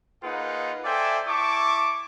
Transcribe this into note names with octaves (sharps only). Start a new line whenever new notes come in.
A#3 D#4 F4 G#4 B4 F#5
A4 C5 D5 E5 G5 G#5
E4 A5 C#6 D6